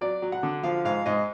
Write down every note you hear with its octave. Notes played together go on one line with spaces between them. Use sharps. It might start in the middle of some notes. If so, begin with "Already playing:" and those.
F#3 D5
F#3
F#5
D3
F3 F5
G#2 F5
G#2 D#5